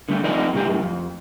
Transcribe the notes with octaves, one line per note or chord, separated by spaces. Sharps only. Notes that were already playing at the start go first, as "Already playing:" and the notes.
D3 G3 A3
F3 A3 C4 D#4 D5 D#5
A2 C3 G3 G4
F#2 A2
F2